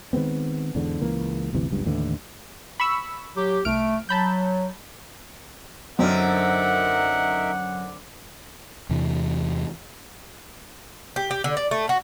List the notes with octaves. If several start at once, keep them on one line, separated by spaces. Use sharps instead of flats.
D#3 G#3 B3 C4
E2 G#2 D3
C#2 E3 A#3
G1 D2 C3 E3
F#1 C#2 G2
D#2 A2 D3 E3
B5 C#6 E6
F#3 G4
C2 A3 F6 D7
F#3 A5 B5 G6
F#2 D3 C4 D#4 A#4 E5 F#5 F6
E2 C3 E3
G4
G4
D3
D5
A3
F#4